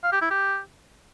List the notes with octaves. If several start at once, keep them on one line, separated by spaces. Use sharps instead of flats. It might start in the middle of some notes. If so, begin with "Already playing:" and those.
F5
G4
E4
G4